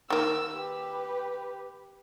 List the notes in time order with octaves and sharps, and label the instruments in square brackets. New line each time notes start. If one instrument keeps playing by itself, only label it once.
[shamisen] D#3 A#3 [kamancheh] E6
[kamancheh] G4 B4